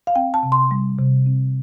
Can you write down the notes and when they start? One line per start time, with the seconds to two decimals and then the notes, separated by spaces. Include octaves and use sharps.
0.07 F5
0.16 C4 G5
0.34 A5
0.43 C3
0.52 C6
0.71 G3
0.98 C3
1.26 C4